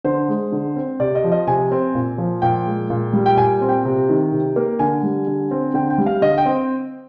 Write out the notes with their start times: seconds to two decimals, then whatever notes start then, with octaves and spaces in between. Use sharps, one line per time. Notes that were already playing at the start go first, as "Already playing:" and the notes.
0.04 D3 C5
0.28 G#3
0.52 D3
0.76 C4
1.00 C3 D5
1.15 D#5
1.24 F3
1.32 D#5
1.47 C3 G#5
1.71 C4
1.95 A#2
2.18 F3
2.42 A#2 G5
2.66 G#3
2.90 A#2
3.13 G3
3.26 G5
3.37 A#2 G#5
3.61 C4
3.69 G5
3.85 C3
4.09 D#3
4.32 C3
4.56 A#3
4.79 D3 G#5
5.03 G3
5.27 D3
5.51 C4
5.74 D3 G5
5.90 G5
5.98 G3
6.06 F5
6.21 D3 D#5
6.38 G5
6.46 C4